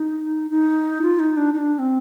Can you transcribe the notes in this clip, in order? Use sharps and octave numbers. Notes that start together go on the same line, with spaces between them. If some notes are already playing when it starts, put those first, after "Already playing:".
Already playing: D#4
D#4
F4
D#4
D4
D#4
D4
C4